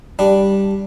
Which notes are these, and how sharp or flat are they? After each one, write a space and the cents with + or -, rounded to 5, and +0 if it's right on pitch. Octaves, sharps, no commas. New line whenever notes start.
G3 +0 D4 +0